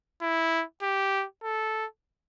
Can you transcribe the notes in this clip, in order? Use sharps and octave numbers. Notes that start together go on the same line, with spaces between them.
E4
G4
A4